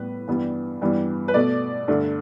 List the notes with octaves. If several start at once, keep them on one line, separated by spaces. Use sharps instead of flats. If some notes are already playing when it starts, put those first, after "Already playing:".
Already playing: A2 G3 B3 B4
G2 E3 G3 B3
G2 E3 G3 B3
B4
B2 A3 D5
G2 D3 A3